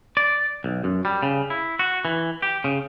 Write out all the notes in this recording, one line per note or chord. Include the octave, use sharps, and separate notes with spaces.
D5
B1
F#2
G3
C#3
E4
F#4
E3
G4
C#3